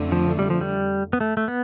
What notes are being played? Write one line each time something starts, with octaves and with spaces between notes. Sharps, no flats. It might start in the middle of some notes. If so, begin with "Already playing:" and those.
Already playing: F2 D3 A3
F3
G3
F3
G3
B3
A3
A3
B3